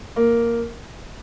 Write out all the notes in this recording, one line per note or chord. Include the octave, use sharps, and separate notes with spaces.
A#3